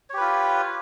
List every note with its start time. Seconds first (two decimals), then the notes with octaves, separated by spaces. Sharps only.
0.10 C#5
0.13 G4
0.17 B4
0.21 F4